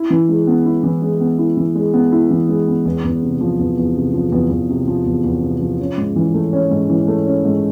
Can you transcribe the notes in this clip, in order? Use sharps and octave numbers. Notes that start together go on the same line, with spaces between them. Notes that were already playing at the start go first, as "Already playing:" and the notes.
Already playing: E4
E3
G#3
B3
E4
E3
G#3
B3
E4
E3
G#3
B3
E4
E3
G#3
B3
E2
E2
C3
F3
E2
E2
C3
F3
E2
E2
C3
F3
E2
E2
C3
F3
C#4
G#2
E3
A3
C#4
G#2
E3
A3
C#4
G#2